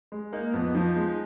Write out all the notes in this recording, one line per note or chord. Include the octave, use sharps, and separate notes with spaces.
G#3
A#3 D#4
F2 B3
F3 D#4
G#3